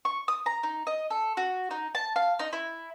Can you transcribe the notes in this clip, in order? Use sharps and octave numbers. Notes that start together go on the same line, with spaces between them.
C#6
D#6
A#5
D#4
D#5
A4
F#4
D#4
A5
F5
D#4
E4